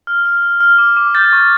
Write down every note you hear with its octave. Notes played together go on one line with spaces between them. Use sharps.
F6
F6
F6
F6
D6
D6
G6 A6
C#6